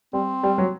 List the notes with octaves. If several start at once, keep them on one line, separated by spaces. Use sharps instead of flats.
G3 C4
G3
F#3